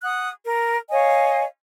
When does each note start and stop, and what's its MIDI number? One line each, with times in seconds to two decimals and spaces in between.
0.04 0.28 78
0.04 0.28 87
0.04 0.28 90
0.44 0.77 70
0.90 1.44 73
0.90 1.44 75
0.90 1.44 77
0.90 1.44 80